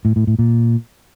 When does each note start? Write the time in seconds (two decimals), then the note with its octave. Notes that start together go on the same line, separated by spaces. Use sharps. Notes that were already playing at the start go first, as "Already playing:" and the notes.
0.05 A2
0.16 A2
0.27 A2
0.39 A#2